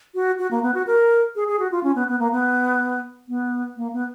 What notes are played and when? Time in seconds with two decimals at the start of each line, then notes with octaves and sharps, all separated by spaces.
0.15 F#4
0.39 F#4
0.51 A#3
0.63 B3
0.74 F#4
0.87 A#4
1.36 G#4
1.48 G#4
1.59 F#4
1.72 F4
1.83 C#4
1.95 B3
2.08 B3
2.19 A#3
2.32 B3
3.28 B3
3.77 A#3
3.93 B3